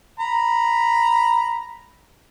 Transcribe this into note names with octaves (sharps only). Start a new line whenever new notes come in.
A#5 B5